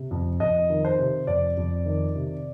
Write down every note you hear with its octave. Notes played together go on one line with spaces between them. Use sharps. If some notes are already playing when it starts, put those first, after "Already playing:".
Already playing: C3
F2
F2 D#5
D#3
C5
C3
F2 D5
F2
D#3
C3